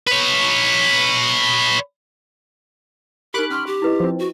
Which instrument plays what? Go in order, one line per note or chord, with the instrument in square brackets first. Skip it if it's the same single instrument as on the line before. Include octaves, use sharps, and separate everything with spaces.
[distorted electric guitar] B4 C#5
[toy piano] D#4 G4 [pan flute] A#4 [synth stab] B5 D6 F#6
[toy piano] C#4 C6 C#6 [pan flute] F6
[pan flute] G4
[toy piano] E4 B4 D#5
[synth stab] F3 C4
[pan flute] F#4